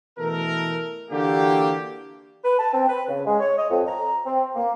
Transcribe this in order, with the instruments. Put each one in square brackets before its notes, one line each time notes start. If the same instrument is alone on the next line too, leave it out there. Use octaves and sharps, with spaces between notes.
[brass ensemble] B2 E3 A3 A4 A#4
D3 E3 A#3 F#4 G4
[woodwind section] B4
A5
C4
B4
C#3
G#3
C#5
D#5
F2
A#5
C4
A#3